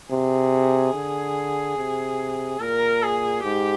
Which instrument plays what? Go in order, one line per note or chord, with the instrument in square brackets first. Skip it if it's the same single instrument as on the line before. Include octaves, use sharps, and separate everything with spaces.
[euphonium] C3 [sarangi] G#4
[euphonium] D3
C3
[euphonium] A#2 [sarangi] A#4
[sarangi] G#4
[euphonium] G#2 [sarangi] G4